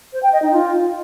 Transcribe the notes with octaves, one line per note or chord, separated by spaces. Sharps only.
C5
G5
D#5
D#4
F4